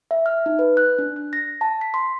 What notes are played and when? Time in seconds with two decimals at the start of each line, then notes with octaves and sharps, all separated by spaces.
0.11 E5
0.26 F6
0.46 D#4
0.59 B4
0.77 F#6
0.99 D4
1.16 F#6
1.33 A#6
1.61 A5
1.81 B6
1.94 C6